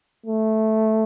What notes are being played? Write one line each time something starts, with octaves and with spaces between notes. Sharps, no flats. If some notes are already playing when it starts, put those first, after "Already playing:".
A3